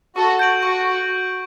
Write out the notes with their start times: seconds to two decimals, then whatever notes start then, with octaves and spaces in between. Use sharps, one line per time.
0.16 F#4 A4 C#6
0.39 G6 D7 F#7
0.63 F#4 C#6